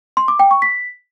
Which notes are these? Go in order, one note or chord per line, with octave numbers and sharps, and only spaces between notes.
C6
D6
G5
C#6
B6